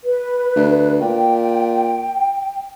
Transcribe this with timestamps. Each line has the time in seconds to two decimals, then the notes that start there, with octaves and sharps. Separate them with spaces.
0.05 B4
0.55 D2
1.01 A#2 G5